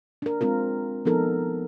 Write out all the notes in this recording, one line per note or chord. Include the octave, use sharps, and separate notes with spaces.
D4 A#4
G#3 C4 F4 A#4
F3 B3 D#4 A4 A#4